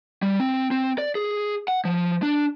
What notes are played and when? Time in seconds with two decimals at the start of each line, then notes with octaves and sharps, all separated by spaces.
0.22 G3
0.40 C4
0.71 C4
0.98 D5
1.15 G#4
1.68 F#5
1.85 F3
2.23 D4